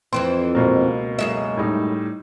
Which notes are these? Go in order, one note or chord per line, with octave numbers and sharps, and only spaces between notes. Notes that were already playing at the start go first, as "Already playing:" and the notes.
F2 E3 C4 C6
C#2 B2 A#3
F#2 G#3 E5
A2 G3 D#4